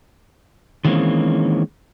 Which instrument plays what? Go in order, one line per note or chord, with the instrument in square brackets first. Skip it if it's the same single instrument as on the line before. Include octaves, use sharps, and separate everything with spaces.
[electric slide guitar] D#3 E3 G#3 A#3 C4 C#4